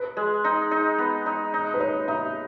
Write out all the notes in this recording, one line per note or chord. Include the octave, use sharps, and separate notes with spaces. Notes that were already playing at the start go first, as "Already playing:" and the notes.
Already playing: B4
G#3
D#4
D#4
B3
D#4
D#4
B4
D#4 C#5
D#4 E5